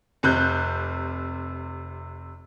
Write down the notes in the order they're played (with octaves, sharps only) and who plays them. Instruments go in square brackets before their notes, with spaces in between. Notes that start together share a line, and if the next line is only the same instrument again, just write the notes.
[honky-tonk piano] F1 C3 F#6 G6